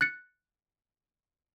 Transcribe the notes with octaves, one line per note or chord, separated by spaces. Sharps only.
F#6 A6 C#7